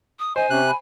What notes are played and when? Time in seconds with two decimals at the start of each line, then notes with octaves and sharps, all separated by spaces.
0.19 D#6
0.36 C5 D#5 G#5
0.50 C3 C#4 F#6
0.68 B5